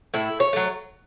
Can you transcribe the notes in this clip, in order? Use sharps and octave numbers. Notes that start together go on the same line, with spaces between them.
A2 E4
C#5
F#3 A3